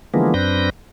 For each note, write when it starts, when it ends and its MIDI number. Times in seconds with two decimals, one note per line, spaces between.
0.14 0.34 50
0.14 0.34 52
0.14 0.34 53
0.14 0.34 56
0.14 0.34 58
0.14 0.34 59
0.34 0.70 42
0.34 0.70 60
0.34 0.70 62
0.34 0.70 71
0.34 0.70 91
0.34 0.70 94